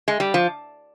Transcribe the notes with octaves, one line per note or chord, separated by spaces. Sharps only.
G#3
G3
F3